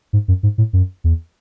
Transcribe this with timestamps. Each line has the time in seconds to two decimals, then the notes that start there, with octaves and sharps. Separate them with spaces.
0.13 G#2
0.28 F#2
0.43 G#2
0.58 A2
0.73 F#2
1.04 E2